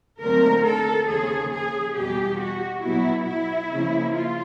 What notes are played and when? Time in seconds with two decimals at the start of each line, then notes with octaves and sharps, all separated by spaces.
0.22 D#2 D3 F#3 A3 C4 A#4
0.66 A4
1.09 D#2 C#3 F3 G#4
1.52 G#4
1.97 E2 B2 G3 G4
2.40 F#4
2.83 B2 F#3 B3 E4
3.26 E4
3.71 C#3 F3 A#3
4.13 F4